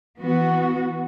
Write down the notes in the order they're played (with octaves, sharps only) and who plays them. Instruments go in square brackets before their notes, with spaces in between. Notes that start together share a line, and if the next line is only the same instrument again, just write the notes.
[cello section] E3 B3 F#4